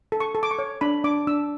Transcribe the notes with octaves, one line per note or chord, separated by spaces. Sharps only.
A4
C#6
A4
D6
C#6
C#5
D4 B5
D4 D6
D4 E6